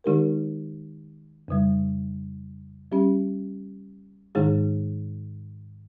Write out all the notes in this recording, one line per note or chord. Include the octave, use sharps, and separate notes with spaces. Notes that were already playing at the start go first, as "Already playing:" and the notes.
D#3 G#3 D#4 G4 A#4
F2 C#3 G3
G3 C#4 G4
G#2 D#3 G#3 D#4 G#4